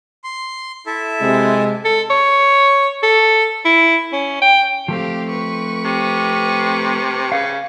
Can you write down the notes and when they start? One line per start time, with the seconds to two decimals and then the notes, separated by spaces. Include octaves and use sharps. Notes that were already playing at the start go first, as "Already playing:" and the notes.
0.24 C6
0.86 E4 A4 E5
1.21 C3 G#3
1.85 A4
2.10 C#5
3.03 A4
3.65 E4
4.13 C#4
4.42 G5
4.88 F3 A3 C4 G4 F5
5.30 B4 C#6
5.85 C3
7.32 C#3 F5